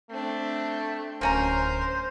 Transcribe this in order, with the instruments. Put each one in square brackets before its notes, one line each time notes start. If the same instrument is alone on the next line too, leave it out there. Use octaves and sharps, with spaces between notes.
[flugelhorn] A3 [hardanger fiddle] C4 D4
[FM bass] D1 [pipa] A#3 C#4 A#5 [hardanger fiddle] A#4 [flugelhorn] C5